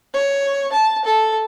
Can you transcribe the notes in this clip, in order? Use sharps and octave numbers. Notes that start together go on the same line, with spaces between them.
C#5
A5
A4